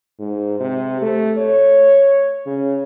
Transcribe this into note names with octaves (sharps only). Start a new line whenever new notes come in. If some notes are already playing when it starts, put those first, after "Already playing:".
G#2
C3
A3
C#5
C#3